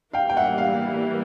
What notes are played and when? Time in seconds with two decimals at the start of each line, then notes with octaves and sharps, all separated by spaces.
0.13 E3 G3 A#3 F5 G5
0.29 G5
0.37 E5 F#5
0.58 F5